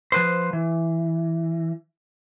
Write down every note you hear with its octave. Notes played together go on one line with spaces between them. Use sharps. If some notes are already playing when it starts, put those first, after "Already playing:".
F3 B4 C5
E3